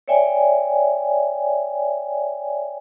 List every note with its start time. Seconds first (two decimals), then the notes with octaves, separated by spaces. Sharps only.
0.08 C#5 D5 E5 G5 G#5